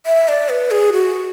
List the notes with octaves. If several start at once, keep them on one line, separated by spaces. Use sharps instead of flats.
E5
D5
B4
G#4
F#4